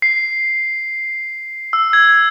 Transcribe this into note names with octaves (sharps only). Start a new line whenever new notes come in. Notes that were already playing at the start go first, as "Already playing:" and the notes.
C7
E6
G#6